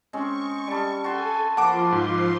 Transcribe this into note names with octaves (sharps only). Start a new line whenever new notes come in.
G#3 C4 C#4 C#6
G3 A4
F#4 A4 G#5 A5 C6
F3 A#3 F4 F#5 A5 B5 C6 D6
G#2